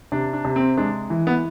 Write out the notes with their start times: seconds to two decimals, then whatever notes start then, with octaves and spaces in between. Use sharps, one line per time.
0.12 C3 D4
0.33 D4
0.45 C3
0.56 C4
0.77 G#3 D4
1.10 E3
1.27 B3